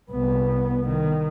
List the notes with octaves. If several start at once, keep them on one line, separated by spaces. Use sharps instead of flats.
C2 B3
D#3